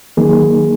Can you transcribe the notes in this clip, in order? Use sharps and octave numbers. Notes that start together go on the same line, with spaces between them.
D#3 F#3 A#3 D#4 G#4